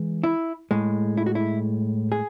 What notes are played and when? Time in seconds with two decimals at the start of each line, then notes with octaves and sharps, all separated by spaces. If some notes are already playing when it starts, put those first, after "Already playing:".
Already playing: E3 G#3
0.24 E4
0.71 A2 G#3
1.17 E4
1.26 F#4
1.35 E4
2.12 G#4